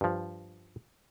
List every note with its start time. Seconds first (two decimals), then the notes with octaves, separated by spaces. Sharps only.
0.01 G2 F3